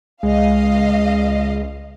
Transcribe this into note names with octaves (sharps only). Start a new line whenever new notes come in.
C#2 G#3 D#5 F5